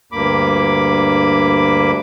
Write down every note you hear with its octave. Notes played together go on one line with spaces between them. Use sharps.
D2 G2 A#3 B5 D6